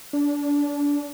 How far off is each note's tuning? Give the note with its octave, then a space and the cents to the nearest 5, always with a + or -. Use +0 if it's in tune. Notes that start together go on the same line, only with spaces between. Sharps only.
D4 -25